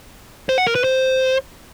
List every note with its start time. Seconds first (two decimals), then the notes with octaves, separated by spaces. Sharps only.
0.49 C5
0.58 F#5
0.67 A#4
0.75 B4
0.84 C5